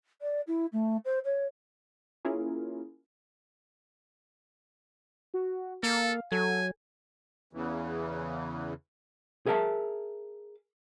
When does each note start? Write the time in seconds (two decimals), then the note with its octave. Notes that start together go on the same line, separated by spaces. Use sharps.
0.22 D5
0.47 E4
0.72 A3
1.05 C5
1.25 C#5
2.25 A#3 C#4 E4 F4 G#4 A#4
5.34 F#4
5.83 A#3 A4 F5
6.32 F#3 A4 G#5
7.53 E2 C#3 E3
9.46 G#4 A#4 E5 G5 A5